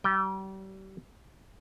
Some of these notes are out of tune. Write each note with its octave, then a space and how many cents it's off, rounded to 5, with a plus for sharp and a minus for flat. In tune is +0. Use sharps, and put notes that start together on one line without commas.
G3 -35 G5 +0